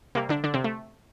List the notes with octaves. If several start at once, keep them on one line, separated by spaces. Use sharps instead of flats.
C3 G3 A#3
D3 D4
D3 D4
C3 C4
A3